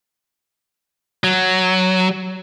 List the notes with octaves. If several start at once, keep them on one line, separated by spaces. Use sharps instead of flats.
F#3